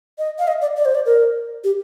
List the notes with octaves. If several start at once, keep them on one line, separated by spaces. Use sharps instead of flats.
D#5
F5
D#5
D5
D5
C5
D5
A#4
G4